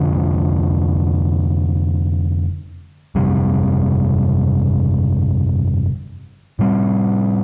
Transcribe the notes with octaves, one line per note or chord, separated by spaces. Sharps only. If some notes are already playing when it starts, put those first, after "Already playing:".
Already playing: F1 F2 D3 F3
G1 F2 C3 G3
A2 G3 C4